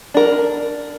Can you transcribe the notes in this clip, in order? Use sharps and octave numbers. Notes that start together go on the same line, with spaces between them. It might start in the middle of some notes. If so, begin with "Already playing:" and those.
D4 A#4